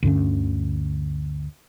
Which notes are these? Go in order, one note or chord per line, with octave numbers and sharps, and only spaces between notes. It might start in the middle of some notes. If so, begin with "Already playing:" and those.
D2 G2 D3 C#4